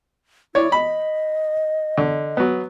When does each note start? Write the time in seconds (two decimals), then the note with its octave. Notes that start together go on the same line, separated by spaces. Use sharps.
0.55 E4 C#5 D5
0.72 D#5 B5
1.98 D3
2.37 F#3 B3